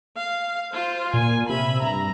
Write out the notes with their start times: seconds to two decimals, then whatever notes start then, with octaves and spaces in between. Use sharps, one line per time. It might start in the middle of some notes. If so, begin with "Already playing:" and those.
0.17 F5
0.73 F4 C5
1.14 A#2 G#5
1.49 C3 E5 B5
1.83 G2 A#5